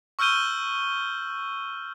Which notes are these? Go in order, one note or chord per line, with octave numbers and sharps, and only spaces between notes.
C#6 E6 F6 G6 D#7 G7